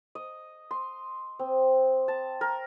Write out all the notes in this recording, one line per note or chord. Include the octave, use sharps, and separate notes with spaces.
D#5
C6
C4
A5
A#4